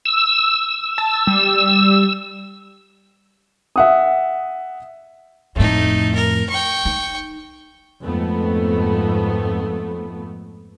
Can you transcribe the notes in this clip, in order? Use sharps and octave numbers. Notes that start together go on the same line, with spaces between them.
E6
A5
G3
E5 F#5 D#6
F2 A2 A3 D#4
A#4
G5 C#6
D#4
F2 G#2 A3 B3